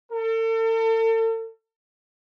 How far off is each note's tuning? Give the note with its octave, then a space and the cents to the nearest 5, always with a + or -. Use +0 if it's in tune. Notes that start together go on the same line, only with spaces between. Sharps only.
A4 +40